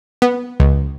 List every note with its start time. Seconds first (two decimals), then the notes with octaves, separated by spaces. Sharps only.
0.22 B3
0.60 C#2